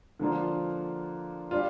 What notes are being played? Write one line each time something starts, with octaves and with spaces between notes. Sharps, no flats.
D3 F3 A#3 D4 F4
G3 D4 F4